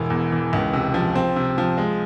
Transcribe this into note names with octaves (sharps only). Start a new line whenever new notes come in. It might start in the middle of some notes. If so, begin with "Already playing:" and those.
Already playing: E1 E3
E2
E3
C#2
C3
F3
C4
C3
F3
G#3